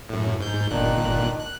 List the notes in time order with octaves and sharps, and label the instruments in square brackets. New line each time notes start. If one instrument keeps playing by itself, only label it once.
[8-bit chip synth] F#2 A2
G#2 G6
[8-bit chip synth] G1 A#2 F#6 [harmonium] D#3 D4 D#4
[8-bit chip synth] F#6